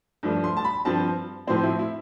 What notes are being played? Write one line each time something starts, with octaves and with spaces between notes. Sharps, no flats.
G2 F3 A3 D4
C6
A5
B5
G2 F3 C4 A5
A2 F3 C4 C5
E4
E4